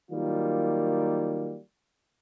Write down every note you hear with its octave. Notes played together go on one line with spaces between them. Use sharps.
D#3 F#3 G3 A#3 F4